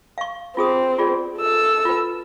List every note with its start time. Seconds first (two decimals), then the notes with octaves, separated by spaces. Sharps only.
0.18 F5 C#6
0.57 C4 F4 G#4 D#6
0.99 F4 G#4 D5
1.39 A4 E6
1.85 F4 B4